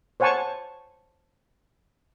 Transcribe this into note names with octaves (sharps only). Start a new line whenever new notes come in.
C5 C#5 F#5 G#5 A5 C#6